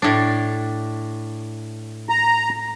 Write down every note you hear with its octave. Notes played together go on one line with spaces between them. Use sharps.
A2 D4
A#5